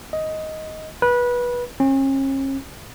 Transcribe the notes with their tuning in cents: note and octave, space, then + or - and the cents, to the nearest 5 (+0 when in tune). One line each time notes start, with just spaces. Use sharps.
D#5 +10
B4 -20
C#4 -40